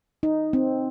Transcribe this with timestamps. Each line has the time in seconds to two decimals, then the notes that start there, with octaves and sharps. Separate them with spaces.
0.23 D#4
0.53 C4